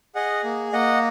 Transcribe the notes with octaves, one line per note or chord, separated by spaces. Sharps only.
G#4 D#5 F#5
A#3
A#3 D#5 F#5